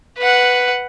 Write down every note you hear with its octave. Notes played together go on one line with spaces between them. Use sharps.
B4 F#5